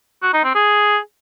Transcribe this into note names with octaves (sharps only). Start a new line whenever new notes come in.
F#4
D#4
C4
G#4